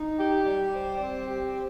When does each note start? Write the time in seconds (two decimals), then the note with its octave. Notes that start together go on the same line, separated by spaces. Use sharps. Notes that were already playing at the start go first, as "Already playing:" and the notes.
Already playing: D#4
0.18 G4
0.45 G3
0.72 C5
1.00 C4
1.27 G4